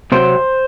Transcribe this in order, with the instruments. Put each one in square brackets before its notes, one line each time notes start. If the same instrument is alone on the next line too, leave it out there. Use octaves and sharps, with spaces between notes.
[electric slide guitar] C3 F#3 C4 C5